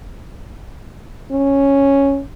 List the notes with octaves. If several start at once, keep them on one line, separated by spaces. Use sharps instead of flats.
C#4